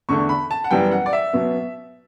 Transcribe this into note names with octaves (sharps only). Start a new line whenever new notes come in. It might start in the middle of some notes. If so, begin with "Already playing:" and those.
E2 D3 A3 C#6
B5
A5
F#5
F#2 E3 G3 B3 G5
F#5
D5
E5
B2 F#3 B3